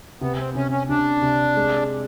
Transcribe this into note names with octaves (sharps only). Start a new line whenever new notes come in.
C3 B3
C4
C3 C#4
C#4
C3 D4
C3
G#3